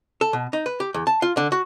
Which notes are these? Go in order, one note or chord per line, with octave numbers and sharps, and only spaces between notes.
A4
B2
D#4
B4
G4
E2
A5
F4
D3
F#4